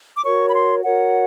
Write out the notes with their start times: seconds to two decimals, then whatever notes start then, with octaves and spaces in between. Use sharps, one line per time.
0.16 D6
0.24 F#4 A#4 C#5 C#6
0.49 B5
0.54 C6
0.83 F#4 A#4 C#5 F#5